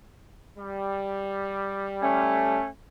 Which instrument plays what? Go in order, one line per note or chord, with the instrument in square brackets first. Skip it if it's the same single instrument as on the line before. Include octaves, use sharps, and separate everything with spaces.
[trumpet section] G3
[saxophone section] A3 C#4